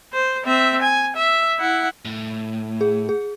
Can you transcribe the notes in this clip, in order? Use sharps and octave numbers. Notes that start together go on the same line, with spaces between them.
C5
C4 E5
G#5
E5
E4 F#5
A2
G#4
G#4